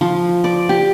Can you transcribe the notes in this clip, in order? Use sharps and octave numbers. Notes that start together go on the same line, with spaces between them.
F3
D5
G4